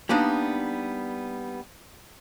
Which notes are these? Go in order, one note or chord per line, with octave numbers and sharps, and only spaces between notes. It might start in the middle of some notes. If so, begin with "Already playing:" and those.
G3 A#3 B3 D4 D#4